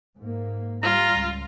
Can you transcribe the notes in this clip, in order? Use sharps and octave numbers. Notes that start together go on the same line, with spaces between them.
G#2 A#3
G3 F4 A#5
C#2